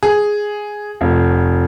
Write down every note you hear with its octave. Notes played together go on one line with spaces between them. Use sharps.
G#4
F1